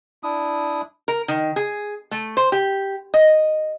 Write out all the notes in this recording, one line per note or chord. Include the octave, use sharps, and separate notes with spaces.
D4 E4 D#6
A#4
D#3
G#4
A3
C5
G4
D#5